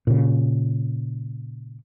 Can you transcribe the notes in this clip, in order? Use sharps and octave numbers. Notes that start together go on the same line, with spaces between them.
A#2 C#3